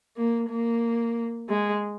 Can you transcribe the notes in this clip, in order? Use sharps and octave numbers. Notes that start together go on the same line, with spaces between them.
A#3
A#3
G#3